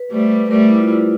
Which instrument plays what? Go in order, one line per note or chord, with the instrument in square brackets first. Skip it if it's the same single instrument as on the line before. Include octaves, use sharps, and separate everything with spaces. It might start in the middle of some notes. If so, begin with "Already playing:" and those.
Already playing: [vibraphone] B4
[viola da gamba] G3 A3 [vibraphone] C5
[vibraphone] B4
B4
[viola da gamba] G3 A3 [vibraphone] A#4
[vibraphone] E4
F4
E4